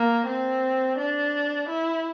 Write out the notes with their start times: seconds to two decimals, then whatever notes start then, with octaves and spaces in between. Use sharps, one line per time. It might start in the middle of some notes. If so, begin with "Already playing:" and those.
Already playing: A#3
0.27 C4
0.98 D4
1.68 E4